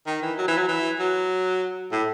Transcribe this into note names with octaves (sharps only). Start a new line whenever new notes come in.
D#3
E3
F#3
E3
F#3
E3
F#3
A2